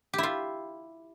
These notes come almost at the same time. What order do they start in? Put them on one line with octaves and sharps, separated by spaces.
G4 E4 F4